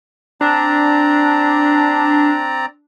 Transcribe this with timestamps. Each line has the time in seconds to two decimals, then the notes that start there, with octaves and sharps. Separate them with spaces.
0.41 C4 D4 D5 A#5